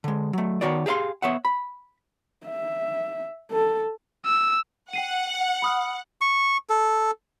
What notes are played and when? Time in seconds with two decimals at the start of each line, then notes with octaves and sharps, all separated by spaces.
0.04 D3 G#3
0.33 F#3 A3
0.61 D#3 F3 B3 F#4 C#5 D5
0.86 G4 G#4 C5 F5 C6
1.22 B3 C#5 E5 F#5
1.45 B5
2.47 E5
3.52 A4
4.25 E6
4.93 F#5 G5 C7 D#7
5.62 B5 D#6 F6
6.21 C#6
6.69 A4